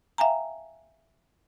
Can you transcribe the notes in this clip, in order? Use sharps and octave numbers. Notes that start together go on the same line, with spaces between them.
E5 F5 G5 G#5 A#5